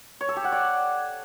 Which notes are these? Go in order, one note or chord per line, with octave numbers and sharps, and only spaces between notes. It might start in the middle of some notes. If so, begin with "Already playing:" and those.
C#5
A4
G4
F#5
D5